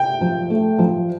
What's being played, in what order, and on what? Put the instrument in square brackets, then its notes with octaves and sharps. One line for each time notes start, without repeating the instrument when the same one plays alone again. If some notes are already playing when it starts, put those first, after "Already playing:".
Already playing: [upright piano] G5
[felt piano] F3
A3
F3